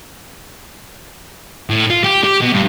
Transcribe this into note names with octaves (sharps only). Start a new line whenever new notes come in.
A2
F4
G4
G4
B2
G2